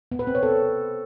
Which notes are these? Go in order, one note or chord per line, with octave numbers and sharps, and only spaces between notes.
B3
B4
C4
C#5
A4